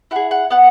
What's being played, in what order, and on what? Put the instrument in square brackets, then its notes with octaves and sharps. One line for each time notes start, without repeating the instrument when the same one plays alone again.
[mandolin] E4 G#4 F#5
F#5
B3 F#5